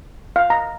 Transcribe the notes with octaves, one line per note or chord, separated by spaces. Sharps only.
F5
A#5